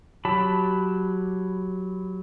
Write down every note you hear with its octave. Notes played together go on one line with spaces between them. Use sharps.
F#3 G4 A5 B5